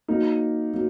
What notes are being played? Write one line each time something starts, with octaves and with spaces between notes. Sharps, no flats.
F#3 A#3 D#4
F#3 A#3